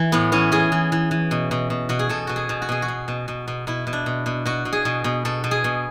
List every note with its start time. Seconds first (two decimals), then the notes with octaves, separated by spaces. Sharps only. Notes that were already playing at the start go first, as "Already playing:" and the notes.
Already playing: E3
0.12 A2 B3
0.32 E3 C#4
0.52 E3 G#4
0.72 E3
0.92 E3
1.11 E3
1.31 B2
1.51 B2
1.70 B2
1.89 B2 F#4
1.99 G#4
2.09 B2 A4
2.27 B2 F#4
2.36 G#4
2.49 B2
2.62 F#4
2.69 B2 G#4
2.82 F#4
2.88 B2
3.08 B2
3.28 B2
3.48 B2
3.67 B2 E4
3.87 B2
3.93 D4
4.06 B2
4.26 B2
4.45 B2 F#4
4.65 B2
4.73 G#4
4.85 B2
5.04 B2
5.25 B2 A4
5.44 B2
5.51 G#4
5.64 B2